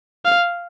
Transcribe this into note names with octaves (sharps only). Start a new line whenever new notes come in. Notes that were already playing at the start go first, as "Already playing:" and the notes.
F5